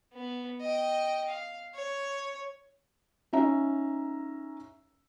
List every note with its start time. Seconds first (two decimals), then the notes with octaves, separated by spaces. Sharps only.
0.13 B3
0.62 D#5 G5
1.27 F5
1.75 C#5
3.33 C#4 D#4 E5 A#5